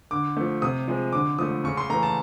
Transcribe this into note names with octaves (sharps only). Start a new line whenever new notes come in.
D3 D6
F3 A3
C3 D#6
F3 G#3
D3 D6
F3 A3 D#6
C#3 C#6
C6
E3 A3 A#5
A5